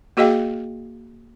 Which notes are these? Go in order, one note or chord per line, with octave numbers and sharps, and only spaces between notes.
A#3 F#4 G#4 D#5 F5 G5